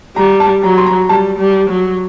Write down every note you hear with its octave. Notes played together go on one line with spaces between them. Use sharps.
G3 A#5
A5
F#3 A#5
C6
A#5
G3 A5
G3
F#3